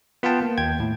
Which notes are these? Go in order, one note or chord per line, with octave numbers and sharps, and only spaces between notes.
B3 F4 B4 F5 G5 A5
A#3
D#2 G5 G#6
A2